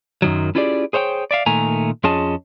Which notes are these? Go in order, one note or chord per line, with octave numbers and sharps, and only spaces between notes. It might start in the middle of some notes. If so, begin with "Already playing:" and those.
F#2 D#3 F#3
C#4 E4 F4 G4 G#4 D5
G#4 C5 C#5 F5 G5
D5 E5 F5
A#2 D#3 A3 E5 G#5 A#5
F2 C#4 F4 G#4 D#5 A5